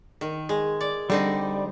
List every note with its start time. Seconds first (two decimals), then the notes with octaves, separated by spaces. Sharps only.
0.21 D#3
0.49 G#3
0.81 D5
1.10 D3 G3 C4 D#4